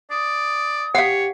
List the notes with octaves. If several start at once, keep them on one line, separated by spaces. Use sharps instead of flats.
D5 D#6
G4 C#5 F5 F#5